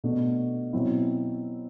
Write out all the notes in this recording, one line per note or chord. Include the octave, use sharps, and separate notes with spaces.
B2 A3 D4
B2 F#3 C4 E4